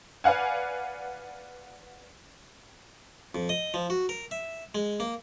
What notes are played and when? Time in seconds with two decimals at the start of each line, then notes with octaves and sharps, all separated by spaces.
0.24 B4 D5 F5 F#5 G#5
3.35 F2
3.49 D#5
3.74 F3
3.90 F#4
4.09 A#4
4.31 E5
4.75 G#3
5.00 A#3